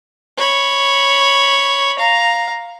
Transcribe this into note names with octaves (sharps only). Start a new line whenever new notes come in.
C#5 B5
F5 A#5